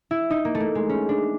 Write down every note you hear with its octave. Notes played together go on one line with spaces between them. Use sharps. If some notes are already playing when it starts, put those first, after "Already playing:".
E4
D#4
A#3
A3
A#3
G#3
C#4
D4